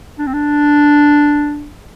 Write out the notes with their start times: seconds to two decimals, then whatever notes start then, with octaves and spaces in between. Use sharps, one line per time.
0.19 D4
0.27 C4
0.34 D4